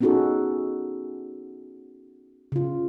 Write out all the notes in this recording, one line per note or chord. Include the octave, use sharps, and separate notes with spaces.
B3 C#4 D#4 F#4 G#4 A4
C#3 F4